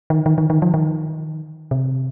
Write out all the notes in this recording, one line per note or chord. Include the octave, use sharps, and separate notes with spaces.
D#3
D#3
D#3
D#3
F3
D#3
C3